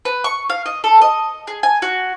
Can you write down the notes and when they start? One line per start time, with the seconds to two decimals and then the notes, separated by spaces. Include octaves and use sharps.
0.05 B4
0.24 C#6
0.50 F5
0.66 D#5
0.84 A4
1.02 D#5
1.47 G#4
1.63 G#5
1.82 F#4